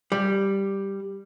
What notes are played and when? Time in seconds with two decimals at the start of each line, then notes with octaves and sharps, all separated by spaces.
0.12 G3